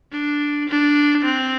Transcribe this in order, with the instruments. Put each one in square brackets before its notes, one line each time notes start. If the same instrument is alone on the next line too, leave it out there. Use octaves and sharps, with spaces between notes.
[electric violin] D4
D4
C4